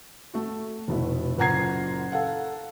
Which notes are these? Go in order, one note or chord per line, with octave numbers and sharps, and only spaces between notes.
A3 F#4
F1 B2 E4
F#1 A#2 F#5 A#5 G#6 C7
A4 F5 F#5